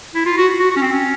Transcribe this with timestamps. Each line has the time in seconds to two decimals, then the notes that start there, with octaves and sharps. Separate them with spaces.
0.15 E4
0.26 F4
0.37 F#4
0.60 F#4
0.71 F#4
0.76 C#4
0.82 C4
0.93 C#4